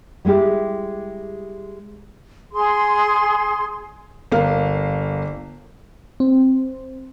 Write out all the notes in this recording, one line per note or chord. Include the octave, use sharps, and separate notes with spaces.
G3 G#3 E4 G4
G#4 C6
G1 A#3 F5
C4